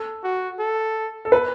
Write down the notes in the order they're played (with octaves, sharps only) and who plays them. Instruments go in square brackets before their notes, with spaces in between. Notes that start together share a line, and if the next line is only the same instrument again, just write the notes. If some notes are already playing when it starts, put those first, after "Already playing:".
Already playing: [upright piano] A4
[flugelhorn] F#4
A4
[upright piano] A4
B4